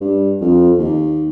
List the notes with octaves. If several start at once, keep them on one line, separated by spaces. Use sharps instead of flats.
G2
F2
D#2